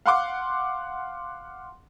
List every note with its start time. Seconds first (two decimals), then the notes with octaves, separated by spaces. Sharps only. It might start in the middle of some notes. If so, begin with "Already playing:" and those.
0.06 F5 F#5 C6 D6